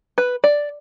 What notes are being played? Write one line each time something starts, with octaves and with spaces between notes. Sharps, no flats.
B4
D5